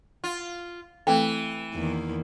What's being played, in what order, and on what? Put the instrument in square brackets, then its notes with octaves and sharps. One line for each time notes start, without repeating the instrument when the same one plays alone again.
[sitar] F4
[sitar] E3 [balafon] A3 C4 A4 [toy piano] G5
[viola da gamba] E2 D#3 A#3